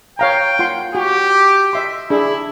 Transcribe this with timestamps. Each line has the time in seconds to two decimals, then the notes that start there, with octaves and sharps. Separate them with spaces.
0.19 C#5 F5 G5 A#5
0.59 F4 F#5 C6
0.95 F#4 G4
1.73 D#5 E5 C6
2.10 D4 E4 G#4